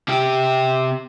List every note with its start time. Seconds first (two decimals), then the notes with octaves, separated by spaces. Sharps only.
0.08 C3 G4